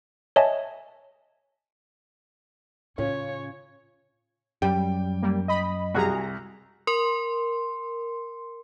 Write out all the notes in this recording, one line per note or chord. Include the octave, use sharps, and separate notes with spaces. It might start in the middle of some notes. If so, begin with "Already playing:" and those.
C#5 D#5 E5 G#5 A5
A2 C#3 C#4 F4 C#5
F#2 G3 G5
G3 A#3
D#5 B5 B6
C2 F#4 G#4 A#5
A#4 C6